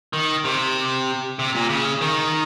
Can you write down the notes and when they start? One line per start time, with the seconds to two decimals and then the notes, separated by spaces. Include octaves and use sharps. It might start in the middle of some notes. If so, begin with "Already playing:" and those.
0.13 D#3
0.44 C3
1.39 C3
1.55 A#2
1.70 C#3
2.01 D#3